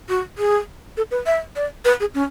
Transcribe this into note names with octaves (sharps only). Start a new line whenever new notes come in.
F#4
G#4
A4
B4
E5
D5
B4
G#4
C#4